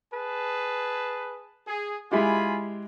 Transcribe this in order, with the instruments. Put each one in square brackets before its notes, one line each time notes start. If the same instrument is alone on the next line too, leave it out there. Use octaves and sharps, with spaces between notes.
[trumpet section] G#4 B4 A5
G#4
[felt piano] G#3 E4 G4 [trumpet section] F4 G#5 B5